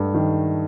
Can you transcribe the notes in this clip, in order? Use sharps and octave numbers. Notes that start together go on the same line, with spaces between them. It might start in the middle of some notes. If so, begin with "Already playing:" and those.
Already playing: G2 A3
D#3